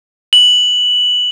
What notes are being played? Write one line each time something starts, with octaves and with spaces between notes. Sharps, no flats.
F#7